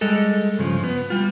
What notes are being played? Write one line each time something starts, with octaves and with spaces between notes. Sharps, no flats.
G3 G#3 A4
G2 C#3 F3
B3
G3 F4